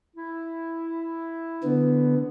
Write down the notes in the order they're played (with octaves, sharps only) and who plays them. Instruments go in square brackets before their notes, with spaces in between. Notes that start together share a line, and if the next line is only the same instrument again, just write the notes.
[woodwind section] E4
[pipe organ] D3 B3